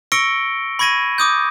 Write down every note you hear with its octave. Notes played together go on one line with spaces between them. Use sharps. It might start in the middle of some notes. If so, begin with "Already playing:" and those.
C#6 E6 A#6 C#7 D7 G7
B5 C#6 G#6 A#6 D#7
D6 D#6 G6